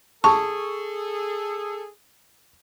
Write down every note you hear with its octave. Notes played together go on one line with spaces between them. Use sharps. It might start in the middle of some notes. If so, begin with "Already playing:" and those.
G#4 A4 A5 C#6